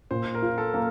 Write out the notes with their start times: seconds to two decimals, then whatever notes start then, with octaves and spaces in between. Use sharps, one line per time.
0.11 A#2 C5
0.35 A#4
0.42 F4
0.58 A4
0.74 A#3